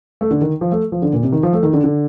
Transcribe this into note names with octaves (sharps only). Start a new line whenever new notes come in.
A3
D3
D#3
F3
A3
F3
D3
A#2
C3
D#3
F3
A3
D#3
D3
D3